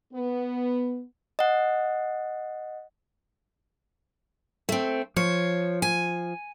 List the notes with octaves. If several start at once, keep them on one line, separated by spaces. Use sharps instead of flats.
B3
D#5 F#5
A3 C4
F3 C#5
G#5